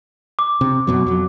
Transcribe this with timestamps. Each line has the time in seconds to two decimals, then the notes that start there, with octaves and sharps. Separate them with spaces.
0.39 D6
0.61 C3
0.87 F#2 B2 F#3
1.06 F2 F#3